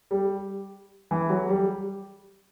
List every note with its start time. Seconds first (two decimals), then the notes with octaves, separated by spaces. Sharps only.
0.11 G3
1.11 E3
1.30 F#3
1.49 G3